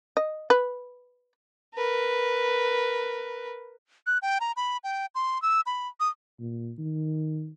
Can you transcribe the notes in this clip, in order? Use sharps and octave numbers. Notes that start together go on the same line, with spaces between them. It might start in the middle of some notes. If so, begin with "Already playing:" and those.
D#5
B4
A#4 B4
F#6
G5
A#5
B5
G5
C6
E6
B5
D#6
A#2
D#3